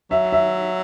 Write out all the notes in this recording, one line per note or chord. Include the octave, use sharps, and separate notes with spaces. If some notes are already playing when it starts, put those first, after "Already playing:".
F#3 E5
E5